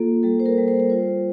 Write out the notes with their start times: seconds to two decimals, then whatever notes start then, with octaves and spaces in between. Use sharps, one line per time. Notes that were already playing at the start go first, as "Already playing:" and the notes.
Already playing: A#3 F4 A4
0.23 G3 A4
0.40 C5
0.46 A#4
0.58 G3
0.68 C5
0.80 A#4
0.90 F4 C5